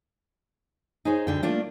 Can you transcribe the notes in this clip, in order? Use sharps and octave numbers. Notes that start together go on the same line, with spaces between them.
D#4 G#4 C5 C#5
D2 D3 G5
A3 A#3 D4 F4